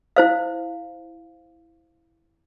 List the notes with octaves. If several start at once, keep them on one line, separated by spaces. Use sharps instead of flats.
E4 C5 F5